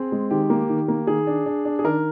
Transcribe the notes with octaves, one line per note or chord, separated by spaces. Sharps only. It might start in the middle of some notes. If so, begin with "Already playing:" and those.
Already playing: C4 G#4
G#3
D#3 G4
A#3
D#3
A#3
D#3 G#4
D4
D4
D4
G#4
D#3 A#4